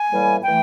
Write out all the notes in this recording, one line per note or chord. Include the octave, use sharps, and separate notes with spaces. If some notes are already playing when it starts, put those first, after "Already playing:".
Already playing: G#5
A2 E3 G3 A#3
E3 A3 G5